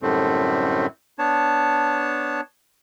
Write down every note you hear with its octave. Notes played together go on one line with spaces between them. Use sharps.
F#2 A2 D3 G3 A3 C4
B3 D4 C#5 A5